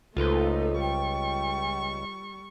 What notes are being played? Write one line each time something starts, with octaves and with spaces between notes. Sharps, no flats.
C#2 A3 D#4 F4 A4 B4 C5
G3 G5 C#6